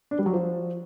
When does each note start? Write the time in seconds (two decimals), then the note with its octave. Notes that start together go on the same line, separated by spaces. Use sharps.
0.11 D4
0.19 G3
0.26 F#3
0.33 F3